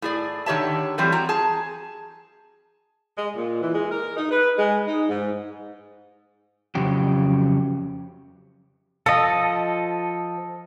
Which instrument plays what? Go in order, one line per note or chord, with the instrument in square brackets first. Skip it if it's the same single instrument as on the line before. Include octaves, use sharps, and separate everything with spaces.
[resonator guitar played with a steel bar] A2 G#4 D5
D3 D#3 G4 C#5 E5 A5
E3 F#3 G3 A3 C4 G4
C4 F#4 A#5
G#4 A5
[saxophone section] G#3
A#2
E3
G#3
A#4
D#4
B4
G#3
D#4
G#2
[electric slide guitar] F2 C#3 F#3 G4
[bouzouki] F3 [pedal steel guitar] A4 D#5